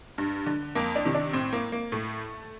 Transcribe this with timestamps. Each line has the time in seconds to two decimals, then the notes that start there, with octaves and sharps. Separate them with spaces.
0.18 G2
0.46 D3
0.75 F2 A#3
0.95 D4
1.05 C3 D#3
1.15 D4
1.33 A2 C4
1.53 A#3
1.72 A#3
1.92 A2 A3